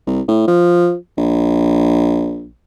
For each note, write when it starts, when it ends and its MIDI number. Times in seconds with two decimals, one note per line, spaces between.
0.07 0.21 36
0.28 0.47 45
0.48 0.95 53
1.17 2.50 34